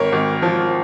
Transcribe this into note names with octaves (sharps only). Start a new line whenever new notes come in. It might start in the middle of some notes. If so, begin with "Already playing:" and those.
Already playing: G#1 A#4 C#5
G#1
F3